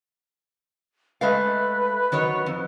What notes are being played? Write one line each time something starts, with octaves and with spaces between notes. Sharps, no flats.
G#3 A3 B4 F5
D#3 F#3 C#5
F2